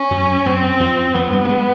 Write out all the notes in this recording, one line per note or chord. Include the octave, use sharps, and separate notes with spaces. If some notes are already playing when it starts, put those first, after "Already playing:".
Already playing: C#4
F#2 F#3
F#2 F#3 C4
F2 F3
F2 F3 B3
G2 G3
G3
G#3